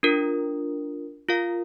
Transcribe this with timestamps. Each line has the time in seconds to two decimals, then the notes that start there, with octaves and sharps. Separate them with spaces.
0.03 D4 F4 A#4
1.29 F4 A#4 F5